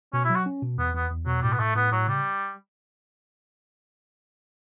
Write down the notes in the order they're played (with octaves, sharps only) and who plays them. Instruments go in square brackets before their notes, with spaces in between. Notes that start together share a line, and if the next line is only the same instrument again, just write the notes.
[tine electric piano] B2 [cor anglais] C#4
[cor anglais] E4
[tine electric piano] F#3
[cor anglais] F#4
[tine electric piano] C#4
B2
[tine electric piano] E2 [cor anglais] B3
[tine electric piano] E2 [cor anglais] B3
[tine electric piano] E2
[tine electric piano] B2 [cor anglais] F#3
[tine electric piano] A2 [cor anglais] G3
[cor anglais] B3
[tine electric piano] A2 [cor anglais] A3
[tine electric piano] A2 [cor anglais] B3
[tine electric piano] A2 [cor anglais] F#3
[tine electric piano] C#3 [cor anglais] G3